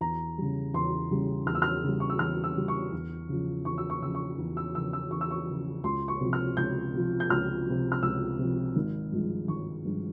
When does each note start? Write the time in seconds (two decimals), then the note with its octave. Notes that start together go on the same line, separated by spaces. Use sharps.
0.01 E2 A#5
0.38 C#3 G3
0.74 E2 C6
1.11 C#3 G3
1.46 E2 F6
1.55 E6
1.62 F6
1.83 C#3 G3
2.00 C#6
2.10 E6
2.19 E2 F6
2.44 E6
2.56 C#3 G3
2.68 C#6
2.93 E2
3.29 C#3 F3
3.65 E2 C#6
3.78 E6
3.90 C#6
4.02 C#3 F3 E6
4.15 C#6
4.38 E2
4.57 E6
4.75 C#3 F3 E6
4.93 E6
5.11 E2 C#6
5.21 E6
5.31 C#6
5.47 C#3 F3
5.84 C#2 C6
6.08 C#6
6.21 C3 F3
6.33 F6
6.57 C#2 G6
6.93 C3 F3
7.20 G6
7.30 C#2 F6
7.66 C3 F3
7.92 F6
8.03 C#2 E6
8.39 C3 F3
8.76 G#1
9.12 G2 F3 G#3
9.48 G#1 C#6
9.85 G2 F3 G#3